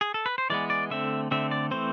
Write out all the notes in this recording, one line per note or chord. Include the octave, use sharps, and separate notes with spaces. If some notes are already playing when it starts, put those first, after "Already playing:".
G#4
A4
B4
C5
E3 G#3 B3 D5
D5
D3 A3 C4 E5
D3 A3 C4 E5
D5
E3 A3 C4 C5